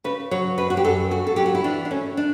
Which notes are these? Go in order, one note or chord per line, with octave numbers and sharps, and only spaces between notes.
C#3 B4
F#3 C#5
F#2 B4
F#4
G4
F#2 A4
C#3 F#4
A4
F#3 G4
F#4
E4
E3 D4
D4
A3 C#4
D4